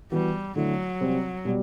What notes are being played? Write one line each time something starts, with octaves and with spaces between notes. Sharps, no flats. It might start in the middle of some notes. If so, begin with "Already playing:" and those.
E3 G3 B3 F#4
D3 F#3 A3 E4
C3 G3 C4
B2 G3